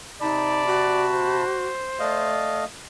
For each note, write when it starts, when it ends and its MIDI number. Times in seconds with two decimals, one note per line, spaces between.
0.21 1.43 48
0.21 0.66 63
0.21 1.08 74
0.21 1.43 81
0.21 1.43 83
0.66 1.67 66
1.14 2.32 72
2.00 2.64 57
2.00 2.61 74
2.00 2.64 75
2.00 2.64 77